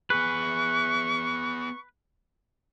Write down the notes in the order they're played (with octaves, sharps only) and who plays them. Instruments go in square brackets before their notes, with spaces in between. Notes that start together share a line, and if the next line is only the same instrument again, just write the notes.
[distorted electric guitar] B3 G#4 [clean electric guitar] B4 [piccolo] C#6